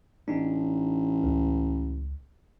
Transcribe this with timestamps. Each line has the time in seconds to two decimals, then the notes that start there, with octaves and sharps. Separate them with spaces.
0.28 A1 D4 D#4
1.24 C#2